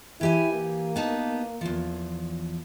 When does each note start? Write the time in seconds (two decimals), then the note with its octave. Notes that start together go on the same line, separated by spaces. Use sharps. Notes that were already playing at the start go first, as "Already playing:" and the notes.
0.21 E3 E4 G4 G#5
0.54 A#3
0.96 B3 D#4 A5
1.61 E2 F3